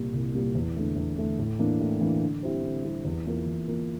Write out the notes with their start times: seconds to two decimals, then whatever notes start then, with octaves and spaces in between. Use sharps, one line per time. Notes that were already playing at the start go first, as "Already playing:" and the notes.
Already playing: C2 A#2 G3 A#3
0.13 C2
0.34 A#2 G3 A#3
0.55 E2
0.76 D3 A3
0.96 E2
1.17 D3 A3
1.39 A2
1.59 E3 A#3 D4
1.80 A2
2.01 E3 A#3 D4
2.22 D3
2.42 G3 C4 E4 G4
2.63 D3
2.84 G3 C4 E4 G4
3.05 E2
3.26 E3 A#3 F4 A#4
3.47 E2
3.68 E3 A#3 F4 A#4